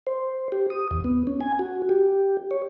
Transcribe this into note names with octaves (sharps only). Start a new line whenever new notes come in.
C5
G4
D#6
E2
B3
C#4
G#5
F#4
G4
C#5